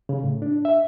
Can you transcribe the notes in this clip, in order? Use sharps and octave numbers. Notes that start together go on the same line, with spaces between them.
C#3
A2
D4
E5